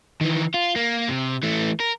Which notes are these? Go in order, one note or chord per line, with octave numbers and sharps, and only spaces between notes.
D#3 E3
F4
A#3
C3
E3 A3
A#4